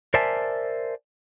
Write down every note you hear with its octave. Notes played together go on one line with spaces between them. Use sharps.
A#4 C5 D5 E5 G#5 A5